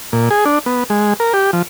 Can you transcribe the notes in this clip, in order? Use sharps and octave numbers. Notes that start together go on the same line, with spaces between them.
A#2
G#4
D4
B3
G#3
A#4
G4
F3